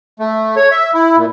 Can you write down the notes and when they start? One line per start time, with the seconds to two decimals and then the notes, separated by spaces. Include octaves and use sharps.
0.19 A3
0.56 C#5
0.71 E5
0.94 E4
1.17 A#2